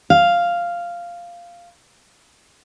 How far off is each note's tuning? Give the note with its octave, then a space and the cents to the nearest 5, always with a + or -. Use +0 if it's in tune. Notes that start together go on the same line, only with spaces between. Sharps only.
F5 -5